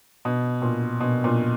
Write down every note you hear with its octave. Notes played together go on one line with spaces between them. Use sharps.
B2
A#2
B2
A#2